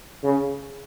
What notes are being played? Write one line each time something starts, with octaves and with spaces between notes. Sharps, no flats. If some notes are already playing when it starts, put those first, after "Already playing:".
C#3